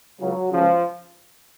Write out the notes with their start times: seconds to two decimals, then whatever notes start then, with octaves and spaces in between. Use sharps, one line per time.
0.21 C#2 C#3 F#3
0.51 C#2 C#3 F3